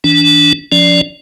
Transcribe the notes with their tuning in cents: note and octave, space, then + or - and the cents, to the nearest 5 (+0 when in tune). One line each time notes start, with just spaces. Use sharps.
E3 -20 D4 -20
F3 +0 C#4 +45 D5 +0